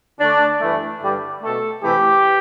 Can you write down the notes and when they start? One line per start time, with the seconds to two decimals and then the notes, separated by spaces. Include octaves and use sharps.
0.20 D3 A3 D4
0.61 G2 E3 A3
1.01 G2 D3 G3
1.41 B2 A3 A4
1.82 C3 E3 A3 G4